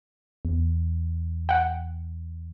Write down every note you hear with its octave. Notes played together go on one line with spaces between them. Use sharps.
E2
F#5 G5